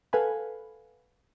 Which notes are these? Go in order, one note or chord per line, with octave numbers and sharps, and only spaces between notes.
A4 B4 F5 F#5 G#5 B5